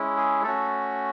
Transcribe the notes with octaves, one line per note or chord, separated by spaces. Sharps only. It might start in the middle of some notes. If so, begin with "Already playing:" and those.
Already playing: G#3 C#4 E4
G#4
A3 C#4 F#4 A4